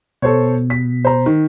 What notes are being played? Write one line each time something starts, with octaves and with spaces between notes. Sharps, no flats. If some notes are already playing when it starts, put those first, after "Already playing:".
B2 A4 C5 C#5
B6
C5 A#5
D#3